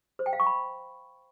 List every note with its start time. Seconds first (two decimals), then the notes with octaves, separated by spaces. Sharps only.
0.19 C5
0.26 G5
0.33 F5
0.40 C#6
0.46 B5